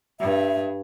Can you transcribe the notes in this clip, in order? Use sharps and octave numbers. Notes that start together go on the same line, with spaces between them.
G2 E5